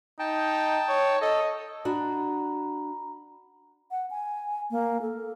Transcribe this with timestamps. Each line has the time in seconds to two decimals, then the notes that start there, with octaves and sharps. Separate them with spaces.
0.19 D#4 G5 A5
0.89 C#5
1.22 A4 D#5
1.85 D4 F#4 A#5 B5
3.91 F#5
4.11 G#5
4.71 A#3
5.02 A4